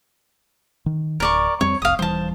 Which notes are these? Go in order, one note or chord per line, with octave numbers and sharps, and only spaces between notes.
D#3
D1 A#4 D5 C#6
F2 G3 C4 C#5
F1 C2 F5 D#6
D#1 E3 G3 C5 A5